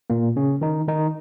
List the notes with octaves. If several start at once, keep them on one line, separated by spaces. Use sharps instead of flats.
A#2 A#3
C#3 C#4
D#3 D#4
D#3 D#4